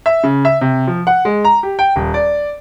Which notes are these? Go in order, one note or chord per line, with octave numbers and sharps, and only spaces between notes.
E5
C#3
E5
C3
F3
F#5
G#3
A#5
G4
G5
D#1
D5